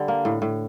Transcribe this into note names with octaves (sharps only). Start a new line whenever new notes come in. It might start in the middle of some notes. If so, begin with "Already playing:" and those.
Already playing: D3 G3
A#3
A2
A2